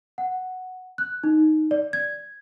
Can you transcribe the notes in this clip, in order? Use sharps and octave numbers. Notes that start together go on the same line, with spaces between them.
F#5
F#6
D#4
D5
G#6